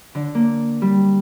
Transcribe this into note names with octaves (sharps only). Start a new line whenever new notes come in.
D3
A#3
G3